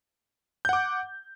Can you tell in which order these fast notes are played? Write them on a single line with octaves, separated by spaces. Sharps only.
G6 F#5 D6